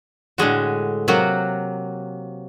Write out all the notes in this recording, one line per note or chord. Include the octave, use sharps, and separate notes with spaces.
A2 D3 G#3 F#4
C3 F#3 A#3 F#4